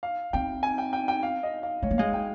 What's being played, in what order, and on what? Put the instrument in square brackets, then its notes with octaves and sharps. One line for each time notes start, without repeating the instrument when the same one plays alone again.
[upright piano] F5
[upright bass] C4 [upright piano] G5
[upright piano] G#5
G5
G5
G5
F5
D#5
F5
[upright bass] G#3 [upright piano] C#5
[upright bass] A#3
[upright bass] G#3 [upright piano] F5
[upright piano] G5